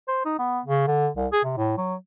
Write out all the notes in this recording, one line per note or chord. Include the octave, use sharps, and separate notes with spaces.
C5
D#4
B3
C#3
D3
C2
G#4
C3
A2
F#3